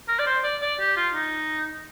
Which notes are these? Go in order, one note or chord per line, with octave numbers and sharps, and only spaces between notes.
A#4
D5
C5
D5
D5
G4
F4
D#4